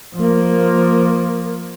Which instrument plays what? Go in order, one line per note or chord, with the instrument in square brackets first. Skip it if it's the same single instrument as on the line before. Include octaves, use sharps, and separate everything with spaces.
[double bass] F3 A#3